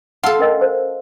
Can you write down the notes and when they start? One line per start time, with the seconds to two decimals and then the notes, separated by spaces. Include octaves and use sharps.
0.23 F4 A4 F#5 A5 E6
0.39 C#4 A#4 D#5
0.61 C5